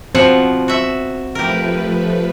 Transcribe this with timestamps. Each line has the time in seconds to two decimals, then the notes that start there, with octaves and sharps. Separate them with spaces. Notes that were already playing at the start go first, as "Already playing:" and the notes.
0.15 B2 F3 C4 F#5
0.68 F#4 E5
1.35 F3 A3 G4 A#4 B4